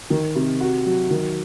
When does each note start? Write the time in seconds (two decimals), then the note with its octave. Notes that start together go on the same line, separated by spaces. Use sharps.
0.10 D#3
0.35 C3
0.60 F#4
0.86 F#3
1.11 D#3